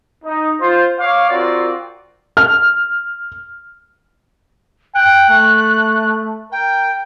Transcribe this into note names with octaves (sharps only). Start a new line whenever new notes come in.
D#4
F4 C5
C#5 F5 D6
C4 F4 F#4 A#4 D5
F6
G5 F#6
A3
A#4 G5